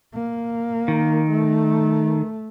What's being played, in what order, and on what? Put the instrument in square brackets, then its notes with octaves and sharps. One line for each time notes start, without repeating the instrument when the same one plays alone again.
[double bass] A#3
[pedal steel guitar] D#3
[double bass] A3